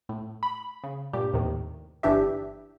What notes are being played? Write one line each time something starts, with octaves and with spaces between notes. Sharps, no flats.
A2
B5
C#3
G2 A#2 G4
D#2 A2 C3 D#3
G1 G2 E3 D4 G4 E5